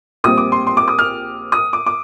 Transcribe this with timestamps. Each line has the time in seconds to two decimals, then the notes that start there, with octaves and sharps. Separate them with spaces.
0.24 A#1 A#2 G3 C4 D#6
0.38 D6
0.52 C6
0.67 C6
0.77 D6
0.88 D#6
0.99 F6
1.52 D#6
1.73 D6
1.86 D6